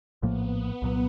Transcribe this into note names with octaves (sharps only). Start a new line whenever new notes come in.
A#1 A2 F3 A#3 B3
C2 A#2 F#3